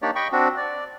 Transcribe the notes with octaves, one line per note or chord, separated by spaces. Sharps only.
A#3 D4 D#4 G4 C#5 D5
D#5 G5 B5 C#6
C4 D4 F#4
D5